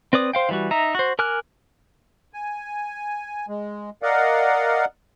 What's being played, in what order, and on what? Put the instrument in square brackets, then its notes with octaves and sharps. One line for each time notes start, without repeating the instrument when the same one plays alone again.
[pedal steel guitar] C4 B4 D5 D#6
C5 F5 G5
E3 G3 F#4
D#4 E5 A#5
F#4 C5
A#4 G#5 D6 F6 F#6
[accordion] G#5
G#3
A#4 D5 D#5 F5 F#5